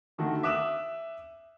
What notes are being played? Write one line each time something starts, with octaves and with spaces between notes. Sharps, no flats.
D3 D#3 A3 F#4
E5 D6 D#6 F#6 E7